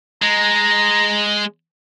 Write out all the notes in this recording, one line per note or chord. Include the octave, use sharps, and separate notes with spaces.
G#3 A#5